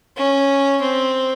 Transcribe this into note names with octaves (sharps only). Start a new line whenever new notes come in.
C#4
C4